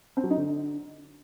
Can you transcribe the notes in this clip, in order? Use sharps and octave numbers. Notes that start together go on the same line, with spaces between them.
C4
F#3
D#4
D3